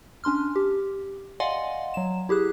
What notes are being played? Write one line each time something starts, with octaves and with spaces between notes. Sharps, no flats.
C#4 D4 C6 F6
G4
D5 D#5 F5 F#5 G#5 C6
F#3 E7
E4 G4 G#4 F#6